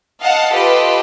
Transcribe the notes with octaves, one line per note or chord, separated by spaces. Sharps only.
D#5 F5 F#5 A5
F4 G4 A4 B4 D#5